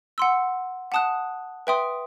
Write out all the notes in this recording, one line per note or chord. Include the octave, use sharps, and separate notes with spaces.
F#5 C6 E6
F#5 A5 D#6 F#6
B4 E5 G5 C6 D#6